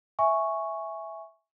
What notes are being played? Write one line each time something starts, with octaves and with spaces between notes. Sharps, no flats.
E5 G#5 C#6